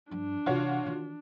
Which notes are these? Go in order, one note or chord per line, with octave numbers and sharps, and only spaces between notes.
G2 F3 D4
C3 E3 F4 F#4 C#5
D#3 E3